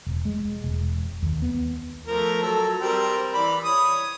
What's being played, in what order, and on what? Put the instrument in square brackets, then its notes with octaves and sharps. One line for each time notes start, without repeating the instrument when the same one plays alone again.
[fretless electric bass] E1
G#3
E1
D#2
B3
[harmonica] F3 A3 A#4
F#3 A4
G3 C4 A#4
E3 D5 B5
C#5 D#6